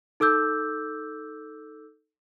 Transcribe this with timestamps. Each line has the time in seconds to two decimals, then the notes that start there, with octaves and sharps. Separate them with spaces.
0.20 D#4 A4 D6 E6 G6